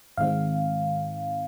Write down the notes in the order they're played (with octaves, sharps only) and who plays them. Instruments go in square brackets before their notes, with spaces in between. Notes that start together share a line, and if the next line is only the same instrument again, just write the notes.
[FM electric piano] G#2 D#3 G#3 C4 F5